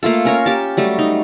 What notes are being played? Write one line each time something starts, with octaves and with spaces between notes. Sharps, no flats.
A3 A#3 F4 A4
C#4 A#4 C#5
G4 A5
F#3 G3 A3
D#4